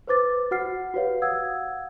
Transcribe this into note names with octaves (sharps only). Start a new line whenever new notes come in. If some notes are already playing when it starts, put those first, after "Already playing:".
B4 C5 D6 A6
F#4 F#5 F6 C7
F#4 G4 B4 C#5 F5
F5 F#5 D#6 E6 G#6